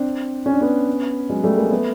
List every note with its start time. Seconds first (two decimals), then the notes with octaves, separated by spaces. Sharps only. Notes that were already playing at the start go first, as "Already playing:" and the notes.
Already playing: C4 D4
0.46 C#4
0.53 D4
0.61 B3 C#4
1.29 F#3 G#3
1.44 G3 A3
1.57 G#3 A#3
1.71 A3 B3